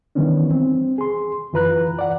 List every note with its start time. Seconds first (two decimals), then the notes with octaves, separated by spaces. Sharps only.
0.15 D#3 E3 G3 B3 C#4 D4
0.51 C4
0.98 G#4 C6
1.53 F#2 E3 F4 B4 A#5 F#6
1.99 D5 F#5